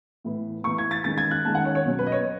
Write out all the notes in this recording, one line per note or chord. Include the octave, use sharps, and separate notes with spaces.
A2 E3 B3
A2 E3 B3 C#6
G#6
A6
D#3 G#3 C#4 A6
G#6
F#6
D#3 G#3 C#4 A5
F#5
C#5
C#5
B2 F#3 C#4
B4
D#5
C#5